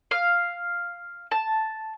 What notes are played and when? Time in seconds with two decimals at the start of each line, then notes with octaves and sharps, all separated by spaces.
0.11 F5
1.31 A5